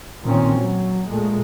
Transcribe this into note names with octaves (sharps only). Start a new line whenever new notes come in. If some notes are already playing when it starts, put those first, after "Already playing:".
A#2 D#3 C4 C#4
F#3
A#2 G#3 A3